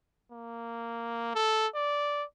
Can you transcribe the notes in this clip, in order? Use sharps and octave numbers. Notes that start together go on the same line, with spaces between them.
A#3
A4
D5